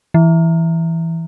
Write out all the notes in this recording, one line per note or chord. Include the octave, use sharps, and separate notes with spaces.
E3